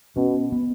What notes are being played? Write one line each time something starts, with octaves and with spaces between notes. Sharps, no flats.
B2 C#4
B3